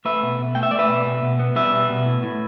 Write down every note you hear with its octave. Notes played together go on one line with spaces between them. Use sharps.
A3 B4 E5
B2
B2
A3 G5
E5
A3 D5
B4 E5
B2
B2
B2
B3
G3 B4 E5
B2
B2
A2
A2